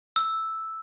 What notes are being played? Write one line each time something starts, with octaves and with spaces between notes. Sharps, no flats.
E6